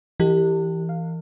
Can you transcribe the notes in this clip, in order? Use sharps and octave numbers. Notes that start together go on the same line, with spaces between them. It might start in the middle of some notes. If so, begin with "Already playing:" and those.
E3 E4 G4
F5